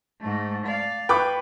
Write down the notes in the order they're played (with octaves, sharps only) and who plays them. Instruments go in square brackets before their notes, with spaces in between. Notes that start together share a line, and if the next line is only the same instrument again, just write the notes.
[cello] G#2 A3
D5 F5
[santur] B4 [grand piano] G5 C#6 D6